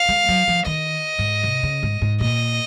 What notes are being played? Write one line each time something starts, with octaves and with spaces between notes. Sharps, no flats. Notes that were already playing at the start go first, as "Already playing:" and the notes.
Already playing: F5
G#3
F#3
F3
D#3 D#5
G#2
C3
C#3
G#2
G#2
A#2 D#5